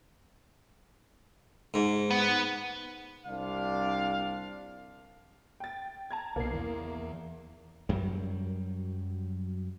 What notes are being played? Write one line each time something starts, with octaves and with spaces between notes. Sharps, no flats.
G#2
B3
C2 C3 D4 F5
G5 A6
A5 A#5 G#6
C2 B2 A#3 C7
E2 E3
F#2 F#3 G3